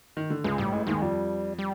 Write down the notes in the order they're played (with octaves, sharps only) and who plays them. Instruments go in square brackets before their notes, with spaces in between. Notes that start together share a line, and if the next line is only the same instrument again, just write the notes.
[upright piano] D#3
D3
[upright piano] C#2 C#3 [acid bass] G#3
[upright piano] A1 A2 [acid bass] G3
[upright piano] A1 A2 [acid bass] G#3
[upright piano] D#2 D#3 [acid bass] G#3
[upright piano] F2 F3 [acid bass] G3
[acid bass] G3